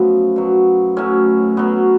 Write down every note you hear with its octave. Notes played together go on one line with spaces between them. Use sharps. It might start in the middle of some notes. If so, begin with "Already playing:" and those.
Already playing: F#2 F3 A3 B3
B2 F#3
A2 F#3 C#4
B2 F#3 B3